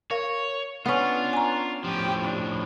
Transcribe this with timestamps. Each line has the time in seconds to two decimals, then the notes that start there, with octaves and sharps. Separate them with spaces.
0.11 A#4 C#5 F5
0.86 B3 C#4 D4 F4 B4 C#5
1.33 G#5 A#5
1.84 A2 F3 G4
2.24 D4